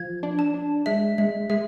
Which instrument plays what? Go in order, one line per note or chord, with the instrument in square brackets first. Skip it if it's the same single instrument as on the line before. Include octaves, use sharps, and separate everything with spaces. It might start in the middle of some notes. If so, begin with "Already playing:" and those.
Already playing: [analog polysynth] F3 [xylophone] G#6
[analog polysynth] D4
[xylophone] A5
[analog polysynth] D4
[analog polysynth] G#3 [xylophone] E5
[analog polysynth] G#3 [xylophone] E5
[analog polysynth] G#3 [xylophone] E5